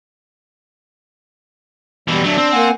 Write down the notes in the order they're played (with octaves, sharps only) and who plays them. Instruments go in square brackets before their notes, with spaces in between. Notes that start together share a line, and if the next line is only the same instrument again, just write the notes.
[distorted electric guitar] B2 E3 [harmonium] G3
[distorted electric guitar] F#3 A3 [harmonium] D4
[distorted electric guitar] C4
[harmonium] A#3 F#5 G#5